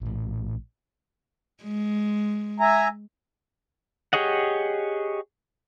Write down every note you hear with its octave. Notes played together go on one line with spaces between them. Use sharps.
A#1 A2
G#3
E5 G#5 A#5
G4 G#4 C#5 D#5 F#5